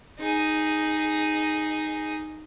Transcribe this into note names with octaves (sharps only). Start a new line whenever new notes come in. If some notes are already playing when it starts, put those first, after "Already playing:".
D#4 G#4